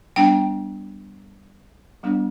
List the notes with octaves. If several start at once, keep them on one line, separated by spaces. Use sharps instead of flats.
G3 B3 D4 G5
G3 B3 D4